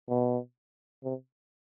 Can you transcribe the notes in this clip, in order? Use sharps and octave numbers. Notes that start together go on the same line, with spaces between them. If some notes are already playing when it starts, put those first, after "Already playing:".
B2
C3